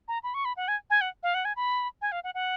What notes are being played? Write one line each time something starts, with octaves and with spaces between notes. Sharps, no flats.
A#5
B5
C#6
B5
F#5
G#5
G#5
F#5
F5
F#5
G#5
B5
G#5
F5
F#5
F#5